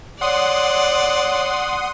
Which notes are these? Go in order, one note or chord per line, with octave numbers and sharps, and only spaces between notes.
C#5 D5 F#5 C6 D#6